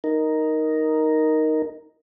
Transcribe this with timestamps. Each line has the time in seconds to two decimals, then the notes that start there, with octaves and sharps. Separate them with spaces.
0.04 D#4 A#4